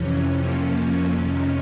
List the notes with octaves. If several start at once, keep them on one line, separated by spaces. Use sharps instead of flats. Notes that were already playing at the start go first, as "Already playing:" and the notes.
Already playing: F2 C3 E3 C#4
F2 C3 F3 A#3 C#4
F2 C3 D#3